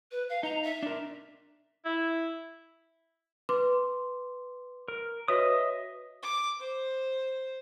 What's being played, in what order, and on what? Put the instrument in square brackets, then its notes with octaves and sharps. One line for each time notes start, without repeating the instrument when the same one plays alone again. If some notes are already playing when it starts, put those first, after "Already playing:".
[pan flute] B4
F5
[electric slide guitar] D#4 [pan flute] A#5
[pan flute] E5
[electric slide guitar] D4 A#4
[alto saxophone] E4
[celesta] B4 C6 D6
[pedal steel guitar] A#4
[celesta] F#4 B4 C#5 [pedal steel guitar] D#5 E5 D#6
[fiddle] D6
C5